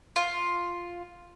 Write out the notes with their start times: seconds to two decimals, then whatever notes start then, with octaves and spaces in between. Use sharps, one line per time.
0.16 F4